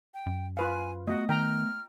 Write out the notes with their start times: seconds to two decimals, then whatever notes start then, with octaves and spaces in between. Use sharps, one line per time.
0.14 G5
0.26 F#2
0.57 F4 B4 F5 G#5
1.07 A3 B3 F#4 D#5
1.29 D#3 G5 A#5 F6